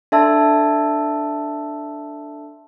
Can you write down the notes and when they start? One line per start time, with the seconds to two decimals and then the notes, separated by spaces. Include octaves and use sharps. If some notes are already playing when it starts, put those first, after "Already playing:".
0.12 D4 A4 E5 A5 C6 E6